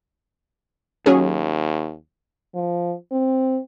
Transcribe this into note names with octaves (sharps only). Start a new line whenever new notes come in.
D#2 F#3 C#4 G#4
F3
C4